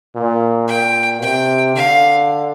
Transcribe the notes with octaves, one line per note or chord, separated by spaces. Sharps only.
A#2
A#2 G5
C3 G5
D3 F5